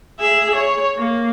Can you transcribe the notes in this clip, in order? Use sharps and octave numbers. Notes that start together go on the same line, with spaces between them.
G#4 E5
C#5
A#3